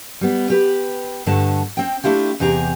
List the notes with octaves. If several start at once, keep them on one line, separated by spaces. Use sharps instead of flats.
G3 B3
G4 B4
G2 D3 A3 A5
C4 G5
A3 D4 E4 F4 G4
E2 C3 G4 G#4 A#5